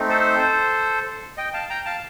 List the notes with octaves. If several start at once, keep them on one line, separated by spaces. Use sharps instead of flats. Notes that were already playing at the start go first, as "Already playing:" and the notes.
Already playing: A3 C4 D#4
A4 C5
D#5 G5
F5 A5
G5 A#5
F5 A5